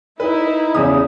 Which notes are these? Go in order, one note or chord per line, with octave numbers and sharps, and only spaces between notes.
D#4 E4 B4
E2 C#3 D#6